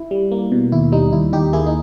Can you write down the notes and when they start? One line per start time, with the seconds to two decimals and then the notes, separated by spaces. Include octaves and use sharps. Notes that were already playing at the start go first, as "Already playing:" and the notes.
Already playing: E4
0.11 G3
0.32 A#3
0.52 B2
0.72 D#2 E4
0.92 G3 D#4
1.13 D#2 E4
1.32 D#2 D#4 G4
1.53 A#3 E4 G#4
1.67 D#4